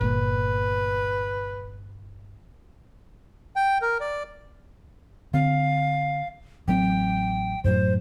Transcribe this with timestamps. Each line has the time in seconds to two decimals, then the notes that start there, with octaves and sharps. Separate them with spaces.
0.01 G1 A#2 B4
3.56 G5
3.82 A#4
4.00 D5
5.34 D3 C4 F5
6.68 A1 F#3 C4 G5
7.64 F#2 A2 F#3 C5